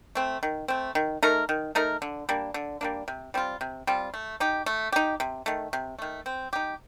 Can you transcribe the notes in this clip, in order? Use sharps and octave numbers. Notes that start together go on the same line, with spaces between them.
A3 C4
D#3
A3 C4
D#3
A3 D#4 A#4
D#3
A3 D#4 A#4
D3
G3 A#3 D4
D3
G3 A#3 D4
C3
G3 C4 F4
C3
G3 C4 F4
A3
D#4 G4
A3
D#4 G4
C3
D#3 A3
C3
D#3 A3
C4
D#4 G4